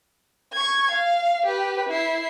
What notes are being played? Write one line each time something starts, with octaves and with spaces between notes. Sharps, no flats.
C#6 G#6
F5
G4 B4
E4 C7